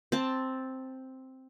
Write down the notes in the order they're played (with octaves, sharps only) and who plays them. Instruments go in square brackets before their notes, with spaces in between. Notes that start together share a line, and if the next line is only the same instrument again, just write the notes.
[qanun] C4 A5